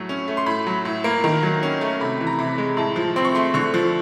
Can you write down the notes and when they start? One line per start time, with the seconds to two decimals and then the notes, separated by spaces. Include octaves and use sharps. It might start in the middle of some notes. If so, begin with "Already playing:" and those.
Already playing: A2 F#3 A3
0.09 C#4
0.28 A3
0.37 C6
0.46 A2 B5
0.67 F#3
0.85 A2
1.04 A#3
1.24 D#3
1.43 F#3
1.63 C#4
1.81 A3
2.00 C3 B5
2.20 E3
2.27 A#5
2.39 C3 B5
2.58 G#3
2.77 A2 A5
2.96 F3
3.16 C4 C6
3.25 C#6
3.35 A3 C6
3.54 D3 C#6
3.74 F3